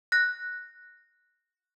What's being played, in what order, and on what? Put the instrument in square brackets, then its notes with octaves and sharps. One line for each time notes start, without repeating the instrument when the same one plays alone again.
[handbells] F#6 A#6